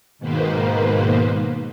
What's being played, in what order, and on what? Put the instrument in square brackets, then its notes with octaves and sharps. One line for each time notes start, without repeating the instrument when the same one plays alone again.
[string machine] G#2 B2 D#3 A#3 B4 C5